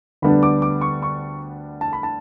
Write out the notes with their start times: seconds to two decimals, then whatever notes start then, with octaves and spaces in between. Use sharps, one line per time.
0.22 D2 D3 G3 B3 D4 B5
0.43 D6
0.62 D6
0.81 C#6
1.02 C#6
1.81 A5
1.93 B5
2.03 A5